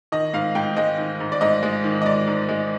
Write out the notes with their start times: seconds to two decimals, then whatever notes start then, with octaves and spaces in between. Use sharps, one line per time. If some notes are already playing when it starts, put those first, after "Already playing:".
0.12 D#3 D#5
0.33 G#2 F5
0.55 G#2 G5
0.77 G#3 D#5
0.98 D#3
1.20 G#2
1.32 D5
1.41 G#2 D#5
1.63 G#3
1.84 D#3
2.02 D#5
2.05 G#2 D5
2.27 G#2
2.49 G#3